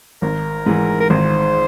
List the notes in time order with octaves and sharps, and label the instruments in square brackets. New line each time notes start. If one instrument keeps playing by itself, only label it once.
[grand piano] G#1 [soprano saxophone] A#4
[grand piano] G#2 E3
[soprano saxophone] A#4
[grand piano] G#1 [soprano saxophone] C5